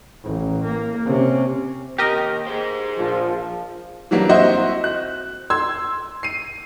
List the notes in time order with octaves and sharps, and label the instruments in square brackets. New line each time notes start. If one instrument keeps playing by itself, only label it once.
[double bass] A1
A#3
C3 C#4
[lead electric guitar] D#2 [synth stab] G4 A#4 D#5
[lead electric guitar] G#4 C5
[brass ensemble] A#1 F3
[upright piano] E3 F#3 G3 A#3 D4
C4 E4 F#4 C5 D#5
F#6
C6 E6 G#6
C7 D#7